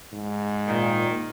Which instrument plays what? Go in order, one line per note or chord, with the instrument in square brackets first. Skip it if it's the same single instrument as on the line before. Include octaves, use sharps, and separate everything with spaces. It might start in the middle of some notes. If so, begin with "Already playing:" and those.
[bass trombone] G#2
[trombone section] A#2 [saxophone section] D#3